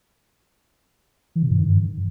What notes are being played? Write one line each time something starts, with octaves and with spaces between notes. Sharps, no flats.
E3
C3
G2
D#3
G2